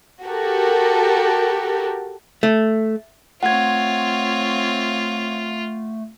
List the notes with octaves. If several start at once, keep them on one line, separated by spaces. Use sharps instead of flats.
F#4 G4 A4 A#4
A3
A3 C4 F4 C#5 F#5 G#6